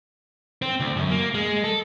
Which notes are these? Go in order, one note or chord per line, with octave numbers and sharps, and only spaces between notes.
C4
D2
F#2
A#3
G#3
A4